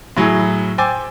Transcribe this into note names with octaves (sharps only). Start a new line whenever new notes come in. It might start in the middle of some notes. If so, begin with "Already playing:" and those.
A2 F#3 E4 G#4
C5 G5 G#5 D6 E6 A6